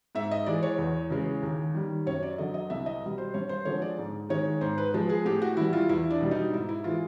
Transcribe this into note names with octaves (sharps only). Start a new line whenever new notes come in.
G#2 E5
D#5
E3 G#3 D5
C#5
E2
C#3 E3 G#3
D#2
D#3 G3
F#2 C#5
D5
D3 F#3 D#5
D#5
C2 E5
D#5
B2 G3
C5
G2 C#5
C5
D3 F3 G#3 C#5
D5
G#2
D#3 G#3 C#5
G#2 C5
B4
F3 G#3
G#4
A2 G4
F#4
E3 G3 E4
F4
E2 E4
D4
B2 G3
D#4
G#2 E4
E4
E3 G#3 F4